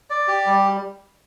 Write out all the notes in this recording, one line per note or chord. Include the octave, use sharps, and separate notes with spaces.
D5
G4
G3